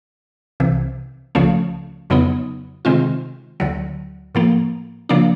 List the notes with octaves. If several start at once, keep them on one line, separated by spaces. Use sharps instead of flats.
C2 C3 E3
C#2 C#3 F3 A3 C#4
F2 C#3 F#3 B3 D#4
C3 D#3 G#3 C4 F4
D2 D3 F#3
A2 F3 A#3
C#3 F3 A#3 D4